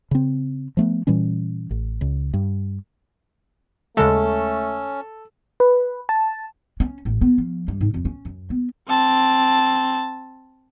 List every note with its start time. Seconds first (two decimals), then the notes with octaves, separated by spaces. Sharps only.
0.11 C#3 C4
0.77 F3 A3 B3
1.07 A#2 E3 G3 C#4
1.71 A1
2.01 C#2
2.34 G2
3.97 D#2 C#3 G#3 A3 C#4 A4
5.60 B4
6.09 A5
6.80 C#4
7.05 A1
7.21 B3
7.38 F3
7.68 G2
7.81 G#2
7.94 F2
8.05 C#4
8.25 F#2
8.50 B3
8.88 C4 A5